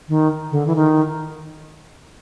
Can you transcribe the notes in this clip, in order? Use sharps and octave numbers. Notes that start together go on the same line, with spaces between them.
D#3
D3
E3
D#3